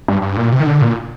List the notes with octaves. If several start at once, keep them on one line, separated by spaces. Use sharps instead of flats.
G2
G2
A#2
C3
D#3
D3
A#2